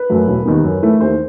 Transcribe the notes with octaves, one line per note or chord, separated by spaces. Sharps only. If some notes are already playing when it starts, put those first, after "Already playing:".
Already playing: B4
F#2 F#3 A3
E1
D#2 D#3 G3 B3
F#2
E3 A3
D#2 C5